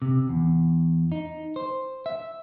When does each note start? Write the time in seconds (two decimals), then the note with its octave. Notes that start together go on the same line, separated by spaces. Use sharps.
0.02 C3
0.29 E2
1.12 D#4
1.56 C5
2.06 E5